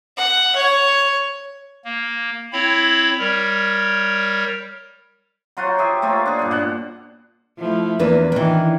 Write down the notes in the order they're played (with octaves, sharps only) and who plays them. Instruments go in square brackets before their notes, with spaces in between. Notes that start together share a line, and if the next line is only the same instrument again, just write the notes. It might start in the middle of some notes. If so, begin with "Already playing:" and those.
[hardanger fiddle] F#5
C#5
[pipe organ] A#3
C4 E4 C#5 B5
G3 A#4 C#5
[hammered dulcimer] F#3 F4 F#4 C5
G4 G#4 E5
A3 A#3 F4 C#5
D4 G#4
G2 A#2
B2 F#5
[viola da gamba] F3 A3 E4
[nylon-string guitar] E2 D4 B4 [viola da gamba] A#3
[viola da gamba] D#3 [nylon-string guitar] E3 D4